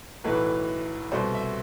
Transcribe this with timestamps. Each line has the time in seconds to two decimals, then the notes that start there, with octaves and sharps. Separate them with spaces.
0.24 B1 A2 E3 A3 B4
1.12 C2 B2 A3 C5
1.35 E5